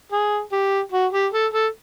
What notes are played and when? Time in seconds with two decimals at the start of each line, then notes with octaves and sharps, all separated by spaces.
0.12 G#4
0.52 G4
0.92 F#4
1.13 G4
1.32 A4
1.53 A4